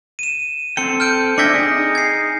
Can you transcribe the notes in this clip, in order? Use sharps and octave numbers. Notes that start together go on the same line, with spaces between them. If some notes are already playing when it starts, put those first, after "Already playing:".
D#7 E7
C4 A4 G5 C#7
F6 G6 D7
D4 E5 G5 G#6 A#6 C#7
D#4 G#4
G#6 C7